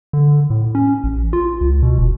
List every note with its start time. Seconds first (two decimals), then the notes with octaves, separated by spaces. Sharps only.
0.13 D3
0.50 A2
0.75 C#4
1.04 A1
1.33 F4
1.61 C#2
1.82 B2
1.98 F1